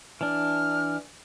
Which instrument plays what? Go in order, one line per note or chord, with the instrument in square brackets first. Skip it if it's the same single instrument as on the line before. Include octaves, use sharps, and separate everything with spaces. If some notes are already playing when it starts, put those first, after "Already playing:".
[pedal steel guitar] E3 D4 [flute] F6